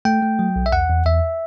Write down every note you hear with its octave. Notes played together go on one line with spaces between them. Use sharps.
A3 G5
A3
F#3
B1
E5
E2 F#5
E2
E2 E5